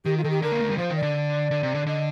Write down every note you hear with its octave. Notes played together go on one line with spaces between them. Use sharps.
D#3 G4
F4
D#3 A4
G4
D3 A#4
A#3
A3
G3
F3 C5
D#3
D5
D3
D3
C3
D3
D3 D#5